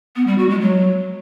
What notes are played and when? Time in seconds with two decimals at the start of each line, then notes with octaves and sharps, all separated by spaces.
0.16 B3
0.27 G3
0.38 F#4
0.49 G#3
0.61 F#3